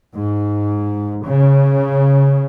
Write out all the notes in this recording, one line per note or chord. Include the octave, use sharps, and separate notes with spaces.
G#2
C#3